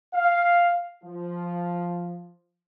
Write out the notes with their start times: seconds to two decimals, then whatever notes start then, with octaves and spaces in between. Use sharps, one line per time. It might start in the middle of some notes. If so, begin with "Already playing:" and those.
0.14 F5
1.04 F3